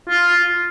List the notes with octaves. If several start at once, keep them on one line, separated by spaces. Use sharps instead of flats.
F4